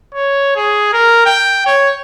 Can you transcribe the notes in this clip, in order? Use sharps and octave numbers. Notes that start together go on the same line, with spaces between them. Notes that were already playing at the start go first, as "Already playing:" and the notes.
C#5
G#4
A#4
G5
C#5